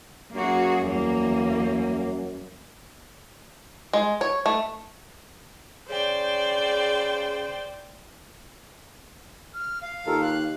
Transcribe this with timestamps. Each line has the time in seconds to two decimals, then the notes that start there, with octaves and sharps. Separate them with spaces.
0.35 F#2 A#3 F#4 G#4
0.87 E2 G3 A#3
3.93 G#3
4.21 C#5
4.46 A3
5.90 C#3 C5 D5 G5
9.54 F6
9.81 F5
10.07 D#2 F4 A4 A#4
10.22 F#6